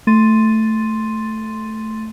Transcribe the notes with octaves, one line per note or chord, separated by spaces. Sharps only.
A3 C6 A6 D#7